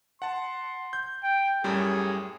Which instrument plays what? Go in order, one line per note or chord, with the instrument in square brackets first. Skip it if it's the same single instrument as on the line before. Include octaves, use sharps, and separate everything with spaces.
[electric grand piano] F#5 A5 [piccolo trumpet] C6
[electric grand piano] G6
[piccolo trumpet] G5
[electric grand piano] F#2 A2 G3 [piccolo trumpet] G#4